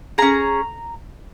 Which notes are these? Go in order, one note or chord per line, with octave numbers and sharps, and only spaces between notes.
C#4 G#4 A#5